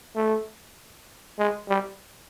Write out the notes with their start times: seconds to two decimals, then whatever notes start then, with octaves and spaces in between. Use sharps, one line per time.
0.16 A3
1.38 G#3
1.69 G3